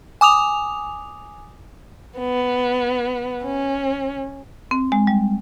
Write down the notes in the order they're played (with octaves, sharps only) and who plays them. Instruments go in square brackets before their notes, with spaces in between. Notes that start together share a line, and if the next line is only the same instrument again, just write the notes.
[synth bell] G#5 D6 D#6 F7
[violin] B3
C#4
[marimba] C4
G#3
G3